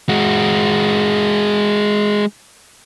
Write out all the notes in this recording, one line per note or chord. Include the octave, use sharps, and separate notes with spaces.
G#3 F#4